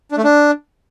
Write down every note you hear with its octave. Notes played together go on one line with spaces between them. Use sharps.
D4
A3
D4